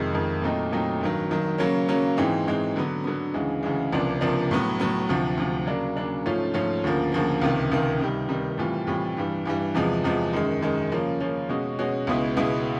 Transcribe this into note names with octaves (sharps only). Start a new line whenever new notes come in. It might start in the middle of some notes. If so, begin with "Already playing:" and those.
Already playing: F2 C3 D#3 G#3
F2 C3 D#3 G#3
A#2 F#3 A3 C4 D#4
A#2 F#3 A3 C4 D#4
G2 D#3 F#3
G2 D#3 F#3
C#3 F#3 A#3 C#4
C#3 F#3 A#3 C#4
G#2 E3 G#3 C4
G#2 E3 G#3 C4
D3 F#3 B3
D3 F#3 B3
D2 C#3 E3 G#3
D2 C#3 E3 G#3
C#2 C3 F3 A#3 D4
C#2 C3 F3 A#3 D4
A2 F#3 B3
A2 F#3 B3
D2 C3 F3
D2 C3 F3
C#3 F#3 A#3 D4
C#3 F#3 A#3 D4
G#2 F3 A3 C#4 F4
G#2 F3 A3 C#4 F4
D2 C#3 F3 A#3
D2 C#3 F3 A#3
C#2 C3 D#3
C#2 C3 D#3
C3 D#3 G3
C3 D#3 G3
A2 E3 G3 C4 F4
A2 E3 G3 C4 F4
G2 E3 G3
G2 E3 G3
E2 C3 F3 G#3
E2 C3 F3 G#3
F#2 D#3 G#3
F#2 D#3 G#3
C#3 F3 A#3 C#4
C#3 F3 A#3 C#4
B2 G#3 C#4 F#4
B2 G#3 C#4 F#4
C#2 B2 G#3 B3 E4
C#2 B2 G#3 B3 E4